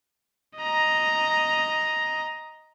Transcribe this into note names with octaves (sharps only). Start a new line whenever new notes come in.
D#5 A#5